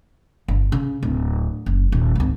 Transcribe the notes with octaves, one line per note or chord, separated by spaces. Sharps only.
G1
C#3
D1
F#1
D#1
G#1 C#2